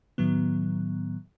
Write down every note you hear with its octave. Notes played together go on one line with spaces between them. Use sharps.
A2 D#3 F#3 B3